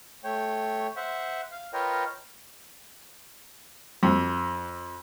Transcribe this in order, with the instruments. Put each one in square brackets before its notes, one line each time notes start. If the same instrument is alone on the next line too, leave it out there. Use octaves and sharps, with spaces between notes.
[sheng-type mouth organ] A3 C#5 G5
C5 E5 F#5
F5
F4 A#4 B4 C#5 D#5 G5
[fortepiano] F2